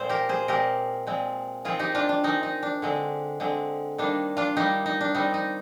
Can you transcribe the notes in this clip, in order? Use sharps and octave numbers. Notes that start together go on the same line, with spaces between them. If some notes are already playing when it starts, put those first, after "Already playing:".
Already playing: A#2 G#3 C4 C5
G4 A#4
G#4 C5
A#2 G#3 C4 G4 A#4
A#2 G#3 C4
D#3 G#3 C4 F4 G#4
D#4 G4
D4 F4
D4
D#3 G#3 C4 D#4
D#4
D4
D3 G#3 C4
D3 G#3 C4
D#3 G3 A#3 D4
D4 F4
D#3 G3 A#3 D#4 G4
D#4
D4
D#3 G3 C4 D#4
D#4